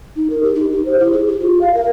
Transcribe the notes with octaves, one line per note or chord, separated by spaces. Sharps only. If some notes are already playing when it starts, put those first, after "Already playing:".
D#4
A#4
G4
D#4
G4
C5
E4
G#4
G4
F4
F5
A#4